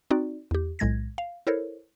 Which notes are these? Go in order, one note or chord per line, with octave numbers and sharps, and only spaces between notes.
C4 D#4 F#4 D5
E2 G4
B1 A2 G#3 G#6 A#6
F5
E4 A4 A#4 C5 C#5